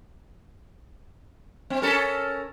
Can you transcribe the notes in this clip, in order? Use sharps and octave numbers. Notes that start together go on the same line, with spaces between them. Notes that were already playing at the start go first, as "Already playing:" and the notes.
C4
C#4 A4 A#4